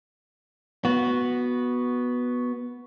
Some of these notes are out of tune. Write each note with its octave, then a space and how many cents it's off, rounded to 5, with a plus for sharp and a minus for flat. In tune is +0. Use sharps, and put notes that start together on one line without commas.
B3 -5 F#4 +0